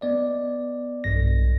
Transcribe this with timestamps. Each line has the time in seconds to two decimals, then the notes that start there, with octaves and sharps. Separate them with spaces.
0.01 B3 D5 D#5
1.04 B1 G2 A#6